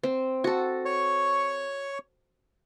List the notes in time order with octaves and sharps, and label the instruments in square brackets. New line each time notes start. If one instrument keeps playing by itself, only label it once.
[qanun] C4
F#4 A4
[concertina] C#5 C#6